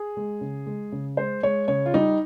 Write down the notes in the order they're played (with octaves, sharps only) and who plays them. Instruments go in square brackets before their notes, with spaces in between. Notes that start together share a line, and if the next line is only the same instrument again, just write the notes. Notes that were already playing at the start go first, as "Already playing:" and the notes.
Already playing: [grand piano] G#4
G#3
C#3
G#3
C#3
G#3 C5
G#3 C#5
C#3 C#5
F4
G3 D#4